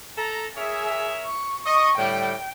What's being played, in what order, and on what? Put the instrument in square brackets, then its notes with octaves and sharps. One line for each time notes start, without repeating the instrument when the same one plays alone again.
[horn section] A4 A#5
[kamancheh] G#4 [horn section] A#4 C#5 E5
[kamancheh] C#6
[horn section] D#5 [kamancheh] C#6
[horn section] A2 D3 G3 [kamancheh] G5